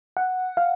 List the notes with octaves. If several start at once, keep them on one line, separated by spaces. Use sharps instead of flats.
F#5
F5